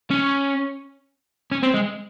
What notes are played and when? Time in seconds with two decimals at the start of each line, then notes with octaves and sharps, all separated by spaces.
0.11 C#4
1.52 C#4
1.63 C4
1.74 G#3